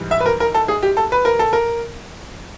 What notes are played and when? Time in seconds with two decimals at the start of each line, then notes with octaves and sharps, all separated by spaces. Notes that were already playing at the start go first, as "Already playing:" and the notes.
Already playing: G#2 E3 G3
0.11 E5
0.20 B4
0.26 A#4
0.40 A#4
0.55 A4
0.68 G#4
0.83 G4
0.97 A4
1.12 B4
1.25 A#4
1.39 A4
1.53 A#4